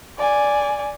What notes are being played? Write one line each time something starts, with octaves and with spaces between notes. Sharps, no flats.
D5 G#5